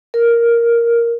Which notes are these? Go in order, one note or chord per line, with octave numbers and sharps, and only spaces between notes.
A#4